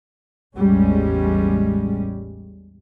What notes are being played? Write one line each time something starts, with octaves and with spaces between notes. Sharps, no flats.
A1 E2 G3 G#3 C#4